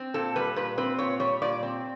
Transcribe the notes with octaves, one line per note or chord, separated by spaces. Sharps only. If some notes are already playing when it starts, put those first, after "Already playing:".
Already playing: C4
A#2 A4
G3 B4
A#2 B4
C4 B4
A#2 C#5
G3 C#5
A#2 D5
C4